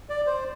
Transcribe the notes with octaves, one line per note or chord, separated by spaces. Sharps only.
D5
C5